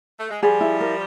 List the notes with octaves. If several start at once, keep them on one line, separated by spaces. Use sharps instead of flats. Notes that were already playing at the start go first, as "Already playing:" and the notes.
A3
G#3
F3 G3 G#4
E4
A#4